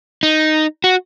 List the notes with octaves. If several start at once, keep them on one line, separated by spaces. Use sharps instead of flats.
D#4
F#4